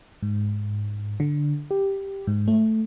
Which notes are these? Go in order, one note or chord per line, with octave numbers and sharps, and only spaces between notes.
G#2
D3
G4
G#2
A3